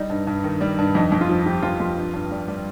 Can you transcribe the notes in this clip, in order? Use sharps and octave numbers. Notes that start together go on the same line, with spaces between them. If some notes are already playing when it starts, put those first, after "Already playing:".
Already playing: G3 D#4
G2
G2
D#3
G3
G2
F2 D#4
F2
F4
F3
F3 G4
F2 F4
F2 F4
G2
G2
G3
G3